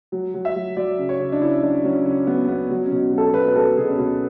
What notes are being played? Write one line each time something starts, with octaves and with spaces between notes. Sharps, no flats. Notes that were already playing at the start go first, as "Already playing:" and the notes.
F#3
F#3
E5
F#3
F#3 D5
C#3
C#5
C#3
D4
C#3 E4
F#3 D4
F#3 C#4
C#3 C#4
F#3 B3
C#3 B3
F#3
C#4
B2
F#3 A4
B2 B4
B4
F#3 A4
B2 G#4
C#4
B2 B3